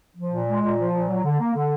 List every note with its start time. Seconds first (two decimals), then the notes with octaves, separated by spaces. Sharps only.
0.15 F3
0.31 A#2
0.46 G#3
0.61 A#2
0.77 F3
0.93 A#2
1.08 F#3
1.23 D3
1.39 A#3
1.54 D3